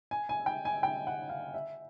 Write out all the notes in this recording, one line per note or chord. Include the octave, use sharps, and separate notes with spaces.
G#5
G#5
G5
G#5
G5
F#5
F5
E5